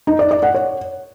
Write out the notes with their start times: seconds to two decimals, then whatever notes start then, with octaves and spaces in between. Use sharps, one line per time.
0.07 D#4
0.19 D5
0.31 D5
0.43 F#5
0.54 C#5